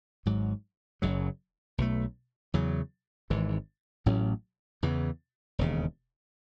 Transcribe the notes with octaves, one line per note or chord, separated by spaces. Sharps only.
G#1 G#2 F#3
F#1 F#2 C#3 F#3
B1 B2 A3
E2 C#3 F#3
G#1 G#2 E3
A1 A2 F#3 C#4
E2 C#3 E3
E1 D#2 C#3